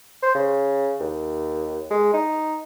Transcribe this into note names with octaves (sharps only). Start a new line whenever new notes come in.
C5
C#3
D#2
G#3
D#4